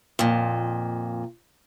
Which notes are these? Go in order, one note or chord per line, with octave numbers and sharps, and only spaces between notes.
F2 A#2